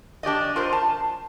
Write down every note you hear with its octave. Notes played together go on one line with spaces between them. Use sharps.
D4 G4 D5 D#5
F4 A#4 C5 D#5
A5